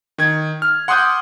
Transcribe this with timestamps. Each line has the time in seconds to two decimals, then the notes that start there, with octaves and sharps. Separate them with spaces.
0.18 D#3 G#6
0.62 F6
0.88 F#5 C6 D6 D#6 F#6 G6